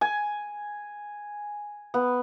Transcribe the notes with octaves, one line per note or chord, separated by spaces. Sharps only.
G#5
B3